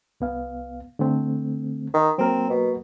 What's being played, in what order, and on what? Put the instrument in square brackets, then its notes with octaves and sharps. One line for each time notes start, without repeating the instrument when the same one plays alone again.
[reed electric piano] C2 B3 F5
D3 A3 C4
[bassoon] D#3
[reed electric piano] F#3 A#3 A#4 [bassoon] C4
[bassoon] B2